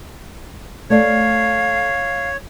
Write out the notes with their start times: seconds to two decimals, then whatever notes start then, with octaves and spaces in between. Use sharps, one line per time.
0.90 A3 C#5 D5 F5